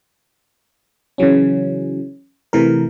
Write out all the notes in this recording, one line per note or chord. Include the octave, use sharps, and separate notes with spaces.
C#3 E3 F#3 C#4
C3 E3 A3 A#4